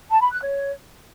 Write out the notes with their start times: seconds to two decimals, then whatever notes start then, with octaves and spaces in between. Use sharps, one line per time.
0.10 A5
0.21 B5
0.32 F#6
0.42 C#5